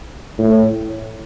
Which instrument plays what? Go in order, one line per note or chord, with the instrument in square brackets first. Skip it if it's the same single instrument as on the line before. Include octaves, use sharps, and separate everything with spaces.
[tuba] A2